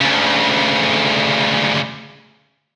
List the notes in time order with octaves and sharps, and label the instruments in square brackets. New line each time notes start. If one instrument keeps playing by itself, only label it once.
[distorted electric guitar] D2 C#3